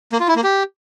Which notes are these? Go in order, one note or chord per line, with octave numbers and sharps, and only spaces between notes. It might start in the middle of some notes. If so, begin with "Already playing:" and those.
A#3
F4
E4
A#3
G4